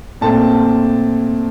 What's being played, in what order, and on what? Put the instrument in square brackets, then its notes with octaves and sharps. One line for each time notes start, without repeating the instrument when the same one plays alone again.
[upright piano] A#2 A3 C4 A5